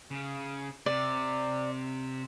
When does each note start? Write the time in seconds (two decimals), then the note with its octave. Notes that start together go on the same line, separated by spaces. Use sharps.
0.11 C#3
0.86 C3 D5